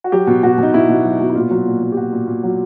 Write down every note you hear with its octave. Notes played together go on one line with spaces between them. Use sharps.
F#4
F#3 G4
B2
B2 F#4
B2 D#4
B2 E4
B2
F#3
B2
E4
A#2 F4
F#3
A#2
F#3
G4
A#2 F#4
A#2
A#2
F#3